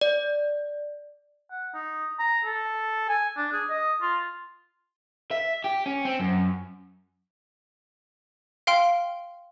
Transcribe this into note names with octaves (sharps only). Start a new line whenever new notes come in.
D5
F#5
D#4
A#5
A4
G#5
D4
G#4
D#5
F4
E5
G4
C#4
C4
F#2
F5 G5 C6 F6 D7